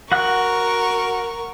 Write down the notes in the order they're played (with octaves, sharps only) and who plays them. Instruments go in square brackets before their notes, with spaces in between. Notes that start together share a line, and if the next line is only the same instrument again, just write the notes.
[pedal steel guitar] F#4 F#5 F#6 [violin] A#4 C#6